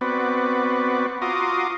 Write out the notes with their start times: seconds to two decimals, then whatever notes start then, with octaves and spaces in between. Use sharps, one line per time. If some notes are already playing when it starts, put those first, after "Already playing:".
0.01 B3 C4 F#4 B4 D5
1.22 F4 F#4 A#5 C6 D6 D#6